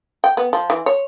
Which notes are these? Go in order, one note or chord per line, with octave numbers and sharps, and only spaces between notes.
G5
B3
F3
E3
C#5